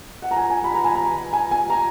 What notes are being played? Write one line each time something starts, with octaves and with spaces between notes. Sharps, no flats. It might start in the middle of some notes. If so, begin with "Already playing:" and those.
F#5
A#5
G#5
G#5
B5
A#5
G#5
A#5
G#5
G#5
A#5